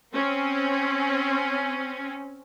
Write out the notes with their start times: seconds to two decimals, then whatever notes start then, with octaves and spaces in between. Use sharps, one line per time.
0.13 C4 C#4